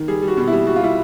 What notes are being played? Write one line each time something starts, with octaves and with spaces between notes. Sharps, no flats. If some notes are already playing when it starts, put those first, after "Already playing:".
Already playing: D#3
G3 G#4
G3
F#4
B2
G3 E4
G3 F#4
F4
G3 E4